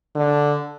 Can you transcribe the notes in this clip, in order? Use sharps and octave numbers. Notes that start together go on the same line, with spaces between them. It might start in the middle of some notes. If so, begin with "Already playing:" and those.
D3